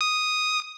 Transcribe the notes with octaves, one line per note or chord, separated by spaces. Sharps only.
D#6